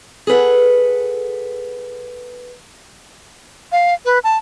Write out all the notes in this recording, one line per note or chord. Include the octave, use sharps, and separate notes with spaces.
G#4 A4 B4 F#5
F5
B4
A5